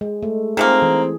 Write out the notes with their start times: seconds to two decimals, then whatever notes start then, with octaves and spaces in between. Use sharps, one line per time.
0.01 G#3
0.23 A3
0.57 D#3 F3 A#3 C4 G#4
0.82 E3